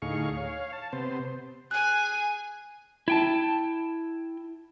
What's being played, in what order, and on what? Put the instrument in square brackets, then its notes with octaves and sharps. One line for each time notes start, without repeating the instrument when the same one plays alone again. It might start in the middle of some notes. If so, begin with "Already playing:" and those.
[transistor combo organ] D2 A2 D#4 G#4 F5 C#6
C#5 F5
A5
C3 B3 C5
[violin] G#4 G#5 [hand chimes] F#6
[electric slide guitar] E4 G5 A5